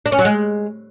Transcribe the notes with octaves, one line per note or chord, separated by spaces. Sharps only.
D4
C#4
F#3
G#3